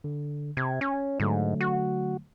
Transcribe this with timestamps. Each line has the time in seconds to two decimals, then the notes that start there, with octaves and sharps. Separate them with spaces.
0.04 D3
0.57 C3 G#6
0.81 C#4
1.20 G#2 D3 F#3 A3
1.61 F#4